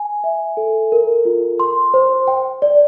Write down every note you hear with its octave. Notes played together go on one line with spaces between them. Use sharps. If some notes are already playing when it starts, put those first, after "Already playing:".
Already playing: G#5
E5
A4
A#4
F4
C6
C5
G5
D5